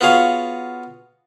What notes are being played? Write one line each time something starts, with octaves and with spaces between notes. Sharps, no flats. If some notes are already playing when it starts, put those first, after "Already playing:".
B3 F4 F#4 G#4 C#5 F5